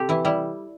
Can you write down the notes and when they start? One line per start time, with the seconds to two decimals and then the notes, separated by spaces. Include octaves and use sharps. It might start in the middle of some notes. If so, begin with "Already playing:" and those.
Already playing: C3 C4 G4 A4
0.09 E3 E4
0.25 G3 E4